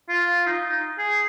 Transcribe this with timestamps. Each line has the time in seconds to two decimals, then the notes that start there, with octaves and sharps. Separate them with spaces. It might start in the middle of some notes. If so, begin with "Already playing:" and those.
0.09 F4
0.47 D#4
0.98 G#4